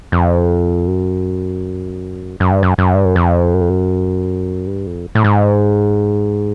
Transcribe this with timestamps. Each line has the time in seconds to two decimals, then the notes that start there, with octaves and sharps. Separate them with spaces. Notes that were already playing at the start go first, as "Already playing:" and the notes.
0.12 F2
0.87 F#2
2.40 F#2
2.51 G2
2.63 F#2
2.78 F#2
2.94 G2
3.05 F#2
3.16 F2
3.54 F#2
3.61 F2
3.69 F#2
4.67 G2
4.87 F2
5.15 A2
5.24 G#2